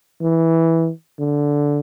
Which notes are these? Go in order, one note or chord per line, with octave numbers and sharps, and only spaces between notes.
E3
D3